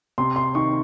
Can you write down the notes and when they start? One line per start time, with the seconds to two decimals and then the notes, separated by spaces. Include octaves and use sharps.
0.18 C3 C6
0.36 C6
0.55 D#3 C#6